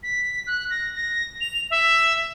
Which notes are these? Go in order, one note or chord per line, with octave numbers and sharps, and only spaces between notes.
B6
F#6
A#6
A#6
F7
E5